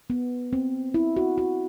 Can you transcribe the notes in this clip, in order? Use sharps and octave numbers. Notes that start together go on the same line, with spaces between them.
B3
C4
E4
F#4
F#4